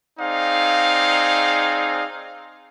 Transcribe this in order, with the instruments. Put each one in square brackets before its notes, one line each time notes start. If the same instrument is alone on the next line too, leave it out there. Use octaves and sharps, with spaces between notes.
[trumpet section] C4 D#4 G#4 D5 F5